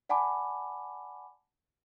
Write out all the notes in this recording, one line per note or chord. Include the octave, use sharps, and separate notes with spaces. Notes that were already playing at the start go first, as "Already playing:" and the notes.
D5 F#5 G#5 A5 B5 D6